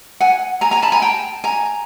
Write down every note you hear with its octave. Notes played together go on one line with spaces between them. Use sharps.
F#5 G#5
G#5 A#5
G#5 A#5
A5 B5
G#5 A#5
G5 A5
G#5 A#5